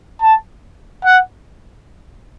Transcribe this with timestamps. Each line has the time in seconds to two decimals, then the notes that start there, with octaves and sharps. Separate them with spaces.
0.22 A5
1.05 F#5